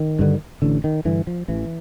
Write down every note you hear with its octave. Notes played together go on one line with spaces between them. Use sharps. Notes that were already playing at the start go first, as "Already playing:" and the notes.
Already playing: D#3
G2 D3
A1 D3
D#3
G2 D3 E3
F3
A1 E3